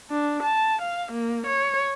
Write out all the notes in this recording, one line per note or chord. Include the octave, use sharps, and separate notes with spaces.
D4
A5
F5
A#3
C#5